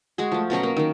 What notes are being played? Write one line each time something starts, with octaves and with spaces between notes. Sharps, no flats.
G#3 F#4 G#4
F3 A3
B2 F#3 C#4 A#5
A#3
D#3 A#3